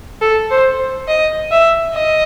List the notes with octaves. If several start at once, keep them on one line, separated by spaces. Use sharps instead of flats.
A4
C5
D#5
E5
D#5